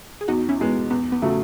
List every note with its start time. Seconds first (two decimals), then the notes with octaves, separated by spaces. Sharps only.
0.21 G#4
0.28 E2 D#4 F#4
0.49 C#4 E4
0.59 B2 G#3 B3
0.90 E2 B3
1.12 B3
1.22 C#3 F#3 A3